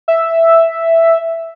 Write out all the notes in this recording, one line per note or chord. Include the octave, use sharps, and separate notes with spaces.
E5